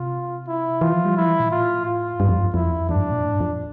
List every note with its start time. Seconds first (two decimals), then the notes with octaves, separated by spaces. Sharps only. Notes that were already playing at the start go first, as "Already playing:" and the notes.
Already playing: C3 F4
0.47 E4
0.81 E3 F4
0.93 F3
1.05 G3
1.16 F3 E4
1.28 E3
1.40 A#2
1.51 A2 F4
1.85 F4
2.20 G2
2.29 F2
2.38 G2
2.54 F2 E4
2.65 E2
2.78 F2
2.89 E2 D4
2.95 G2
3.00 F2
3.12 A#2
3.24 A2
3.32 G2
3.40 F2